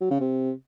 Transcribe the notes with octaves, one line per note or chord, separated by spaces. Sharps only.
F#3
C#3
C3